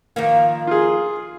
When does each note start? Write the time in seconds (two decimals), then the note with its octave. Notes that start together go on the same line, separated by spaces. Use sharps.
0.16 D#3 F3 A#3
0.67 F4 G#4